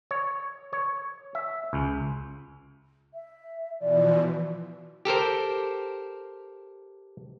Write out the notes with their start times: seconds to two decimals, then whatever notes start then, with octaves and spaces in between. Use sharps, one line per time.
0.11 C#5
0.73 C#5
1.35 E5
1.73 C#2
3.13 E5
3.80 B2 E3 F3 D5
5.05 G4 A4 A#4 C5